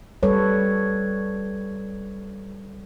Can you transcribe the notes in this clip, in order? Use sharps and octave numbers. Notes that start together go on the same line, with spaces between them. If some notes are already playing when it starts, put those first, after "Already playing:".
G3 A4 B4 C#5